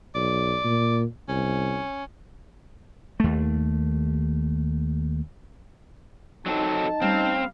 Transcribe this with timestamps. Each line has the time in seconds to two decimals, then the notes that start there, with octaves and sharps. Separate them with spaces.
0.15 B1 D5
0.64 A#2
1.28 C2 C#4
3.20 D#2 A3
6.46 F#3 C4 D#4 A4 A5
7.02 G3 A3 C4 C#4 F5